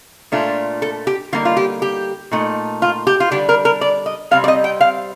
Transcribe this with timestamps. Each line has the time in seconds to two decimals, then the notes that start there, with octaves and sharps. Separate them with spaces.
0.32 A#2 A3 D4 F4
0.82 A4
1.07 G4
1.32 D3 G3 A#3 D#4 F4
1.45 F4
1.57 G4
1.82 G4
2.32 A#2 A3 D#4
2.82 F4
3.07 G4
3.20 F4
3.31 D3 G3 D4 G4
3.49 A#4
3.65 A#4
3.81 D5
4.06 D#5
4.31 C3 G3 C4 F5
4.44 D5
4.48 D#5
4.64 G5
4.81 F5